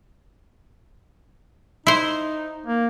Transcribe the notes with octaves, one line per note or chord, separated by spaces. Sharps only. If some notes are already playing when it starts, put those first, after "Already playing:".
D#4 E4 C5
A#3